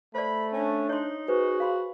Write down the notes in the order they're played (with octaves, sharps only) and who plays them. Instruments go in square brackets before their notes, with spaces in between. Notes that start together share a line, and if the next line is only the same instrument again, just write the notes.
[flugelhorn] A3 [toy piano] C5 D5 [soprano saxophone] B5
[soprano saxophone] C#4 [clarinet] D4
[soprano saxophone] D#4 [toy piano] C#5 C6
[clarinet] F#4 [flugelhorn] G#4 [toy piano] B4 C5
[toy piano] F5 B5 C6